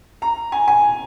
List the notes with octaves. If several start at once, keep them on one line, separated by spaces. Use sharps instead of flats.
A#5
G#5
G#5